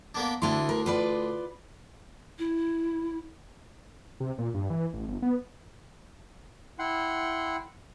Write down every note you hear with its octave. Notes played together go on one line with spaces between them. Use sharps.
A#3 B3 D4
D2 D3 A3 D4 E4 C6
A#4
F4 B4 D5
E4
C3
A#2
G2
E3
A1
G1
B3
E4 F#5 G5 C6